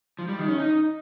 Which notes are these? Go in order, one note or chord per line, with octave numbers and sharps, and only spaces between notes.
F3
G3
D#3
C#4
D#4